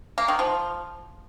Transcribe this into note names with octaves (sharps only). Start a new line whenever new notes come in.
A#3
D#3
F3